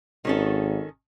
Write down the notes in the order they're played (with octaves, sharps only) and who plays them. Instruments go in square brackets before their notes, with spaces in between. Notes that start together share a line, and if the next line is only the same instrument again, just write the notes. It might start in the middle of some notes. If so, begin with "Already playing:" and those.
[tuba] G#1 [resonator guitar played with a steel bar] D#3 C#4 A4